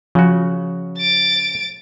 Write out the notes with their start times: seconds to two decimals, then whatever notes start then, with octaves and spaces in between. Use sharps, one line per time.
0.15 C#3 F3 F#4
0.98 A6 D7